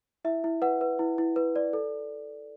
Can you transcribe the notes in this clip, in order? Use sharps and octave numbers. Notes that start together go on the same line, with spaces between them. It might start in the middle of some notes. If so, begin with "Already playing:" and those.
E4 E5
E4
B4 F#5
B4
E4
E4
B4
D5
A4